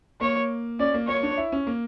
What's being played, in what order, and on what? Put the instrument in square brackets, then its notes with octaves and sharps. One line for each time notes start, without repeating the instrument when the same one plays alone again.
[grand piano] A#3 [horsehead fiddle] C#5
[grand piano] C#4 [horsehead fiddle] D5
[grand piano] A#3
[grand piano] A#3 [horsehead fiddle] C#5
[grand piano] D4
E4
C#4
A#3